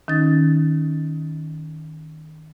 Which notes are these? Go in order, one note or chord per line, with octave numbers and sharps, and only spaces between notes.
D#3 C#4 D#4 A6